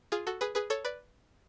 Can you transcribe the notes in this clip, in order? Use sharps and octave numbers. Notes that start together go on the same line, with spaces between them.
F4 G#4
F#4 A4
G#4 B4
G#4 B4
A4 C#5
B4 D5